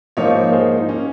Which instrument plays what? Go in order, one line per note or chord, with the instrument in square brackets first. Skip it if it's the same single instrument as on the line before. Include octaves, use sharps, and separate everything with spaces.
[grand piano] G#2 F3 A#3 D#4 [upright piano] A#4 C#5
[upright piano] G#4 C5
D#4
A#3 C#4